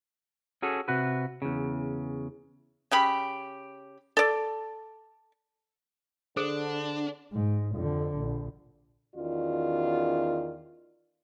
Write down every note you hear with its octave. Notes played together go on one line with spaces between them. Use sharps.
C#4 F#4 G#4 A4
C3 F#4 B4
E2 C#3
C#3 G4 B5
A4 D5
D3 D4 G#4 A4 C5
G#2
F2 D3
A#1
E2 D#3 C#4 F4 F#4 D5